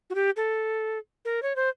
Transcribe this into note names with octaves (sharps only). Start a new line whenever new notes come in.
F#4
G4
A4
A#4
C#5
C5